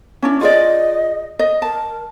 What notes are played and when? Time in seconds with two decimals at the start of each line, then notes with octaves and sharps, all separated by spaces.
0.22 C#4 D4 E4
0.41 F4 G#4 D5 D#5
1.39 D#5
1.62 A#4 A5